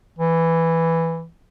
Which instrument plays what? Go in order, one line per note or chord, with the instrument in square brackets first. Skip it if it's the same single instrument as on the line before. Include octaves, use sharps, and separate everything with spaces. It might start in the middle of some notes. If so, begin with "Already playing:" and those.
[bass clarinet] E3